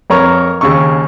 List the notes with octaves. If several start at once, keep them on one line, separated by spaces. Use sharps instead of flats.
F2 A#4 B4 C#5 A#5 C#6
D#2 C#3 C#6